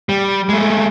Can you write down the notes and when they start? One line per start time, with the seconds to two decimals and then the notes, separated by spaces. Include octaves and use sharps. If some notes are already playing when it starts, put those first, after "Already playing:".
0.09 G3
0.49 G#3 A3